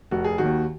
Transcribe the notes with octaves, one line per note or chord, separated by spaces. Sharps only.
F1 F#4
G#4
D#3 F#4
D#2